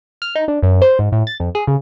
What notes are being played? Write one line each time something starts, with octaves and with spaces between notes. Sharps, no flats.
F6
D#4
D4
F#2
C5
G#2
A2
A6
F2
G#4
C#3